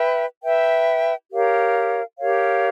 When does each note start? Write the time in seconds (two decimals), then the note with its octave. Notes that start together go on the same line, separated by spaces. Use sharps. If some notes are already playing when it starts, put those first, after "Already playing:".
Already playing: B4 E5 G5
0.43 B4 E5 G5
1.31 G4 A#4 C#5 F5
2.18 G4 A#4 C#5 F5